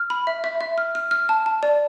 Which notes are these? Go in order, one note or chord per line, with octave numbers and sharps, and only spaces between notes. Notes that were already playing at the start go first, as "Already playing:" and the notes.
Already playing: F6
B5
E5
E5
E5
F6
F6
F6
A5
A5
D5